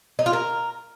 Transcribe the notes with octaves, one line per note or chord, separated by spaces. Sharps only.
D#4
F4
A#4